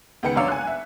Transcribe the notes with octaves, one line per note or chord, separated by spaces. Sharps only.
C#2 D#3 B3 G5 C#7
G#1 F#2 D4 C#5 F5 E6
G#5 F#6
E5